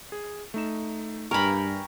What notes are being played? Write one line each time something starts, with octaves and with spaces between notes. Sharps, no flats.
G#4
A3 D#4 E7
G2 A#4 G5 G#5 B5 C#6